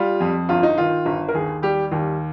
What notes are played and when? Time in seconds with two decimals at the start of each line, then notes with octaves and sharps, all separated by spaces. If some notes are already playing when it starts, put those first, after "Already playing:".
Already playing: G3 F4
0.20 F2
0.49 G1 F4
0.63 D#4
0.77 D#3 F4
1.06 G1
1.28 A#4
1.34 D#2 G#4
1.62 G3 G4
1.92 D#2